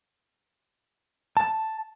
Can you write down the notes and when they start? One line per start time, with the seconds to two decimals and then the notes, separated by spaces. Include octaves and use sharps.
1.37 A5